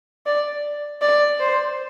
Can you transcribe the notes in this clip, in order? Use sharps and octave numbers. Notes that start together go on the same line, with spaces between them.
D5
D5
C5